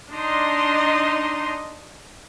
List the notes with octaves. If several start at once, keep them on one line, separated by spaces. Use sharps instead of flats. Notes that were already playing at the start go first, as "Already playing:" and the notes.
D4 D#4 D#5 C6